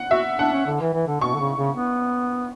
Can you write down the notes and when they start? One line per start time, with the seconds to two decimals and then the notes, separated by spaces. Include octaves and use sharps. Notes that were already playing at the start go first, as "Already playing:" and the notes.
Already playing: F#5
0.11 F#4 E5
0.39 D4 F#5
0.52 C#4
0.66 D3
0.80 E3
0.94 E3
1.07 D3
1.21 B2 C#6
1.34 D3
1.40 C#3
1.57 C#3
1.76 B3